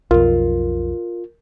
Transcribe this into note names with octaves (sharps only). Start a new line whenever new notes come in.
B1 F2 F4 A#4